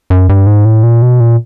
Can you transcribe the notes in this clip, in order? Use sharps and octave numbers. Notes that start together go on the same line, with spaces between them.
F#2
G2
G#2
A2
A#2
B2
A#2